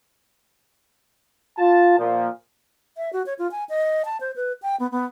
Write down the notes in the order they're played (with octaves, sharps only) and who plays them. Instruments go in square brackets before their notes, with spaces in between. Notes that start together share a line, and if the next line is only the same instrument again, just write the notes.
[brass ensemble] F4 A5
A#2 F3
[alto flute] E5
F#4
C#5
F4
G#5
D#5
A5
C5
B4
G5
B3
B3